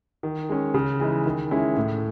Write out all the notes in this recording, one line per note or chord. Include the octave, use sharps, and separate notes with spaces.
D#3
G#3 C#4
C#3
E3 G#3 D#4
D#3
G#3 C#4 E4
A2